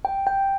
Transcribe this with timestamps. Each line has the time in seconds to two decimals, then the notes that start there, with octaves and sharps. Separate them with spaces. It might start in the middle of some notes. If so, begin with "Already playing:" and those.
0.05 G5
0.27 G5